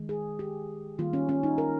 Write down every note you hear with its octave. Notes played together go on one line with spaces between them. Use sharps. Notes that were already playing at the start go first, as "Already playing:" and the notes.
Already playing: D#3 G#3
G#4
G4
D#3 G3 A#3 F4
C#4
C#4
D#4
A#4